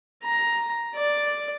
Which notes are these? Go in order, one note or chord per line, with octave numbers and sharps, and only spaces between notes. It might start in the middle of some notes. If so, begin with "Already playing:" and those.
A#5
D5